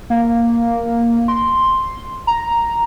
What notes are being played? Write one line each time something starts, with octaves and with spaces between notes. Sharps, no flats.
A#3
C6
A#5